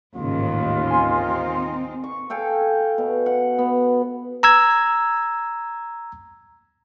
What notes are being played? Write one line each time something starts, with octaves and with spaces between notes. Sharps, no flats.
A1 D#2 G#2 C#3 F4
C4 D#4 G#5 C6
C#6
A4 F5 G5 G#5
B2
F#5
B3
A#5 E6 G#6